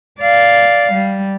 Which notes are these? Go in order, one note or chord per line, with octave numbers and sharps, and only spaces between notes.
D5 F5
G3